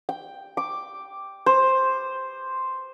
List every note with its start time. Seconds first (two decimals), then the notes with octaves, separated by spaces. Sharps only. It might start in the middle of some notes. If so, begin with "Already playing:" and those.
0.09 G5
0.57 D6
1.46 C5